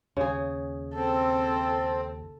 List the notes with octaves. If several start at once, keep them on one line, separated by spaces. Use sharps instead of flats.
D#2 C#3 G#4
C4 A4